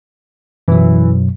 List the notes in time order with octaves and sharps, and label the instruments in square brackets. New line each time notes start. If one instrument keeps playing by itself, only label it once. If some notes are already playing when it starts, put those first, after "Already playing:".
[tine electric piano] F#2 B2 F#3 [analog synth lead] E3